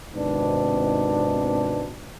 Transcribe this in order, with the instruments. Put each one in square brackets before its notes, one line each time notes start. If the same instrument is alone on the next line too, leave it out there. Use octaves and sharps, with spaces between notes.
[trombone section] G#1 G#2 C3 D#3 B3 D4